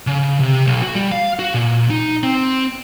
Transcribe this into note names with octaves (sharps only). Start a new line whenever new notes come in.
C#3
C3
B1
F#4
G3
F5
F#4
A#2
D#4
C4